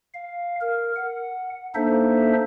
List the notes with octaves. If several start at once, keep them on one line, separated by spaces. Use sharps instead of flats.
F5
A#4
F#5
A#3 D4 D#4 A4 C5 E5